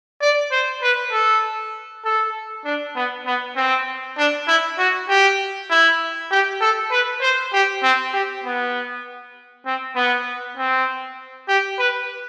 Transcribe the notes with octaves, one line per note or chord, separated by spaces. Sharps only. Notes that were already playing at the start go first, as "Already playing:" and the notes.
D5
C5
B4
A4
A4
D4
B3
B3
C4
D4
E4
F#4
G4
E4
G4
A4
B4
C5
G4
C4
G4
B3
C4
B3
C4
G4
B4